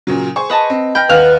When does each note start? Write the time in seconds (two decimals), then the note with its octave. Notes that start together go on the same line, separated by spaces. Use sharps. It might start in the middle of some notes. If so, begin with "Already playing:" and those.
0.07 A#2 C#3 F#3
0.36 G#4 C5 C#6
0.50 B4 D#5 A5
0.70 C4
0.95 G5 B5 F6 A#6
1.09 D#2 B4 F5 F#5 F6 F#6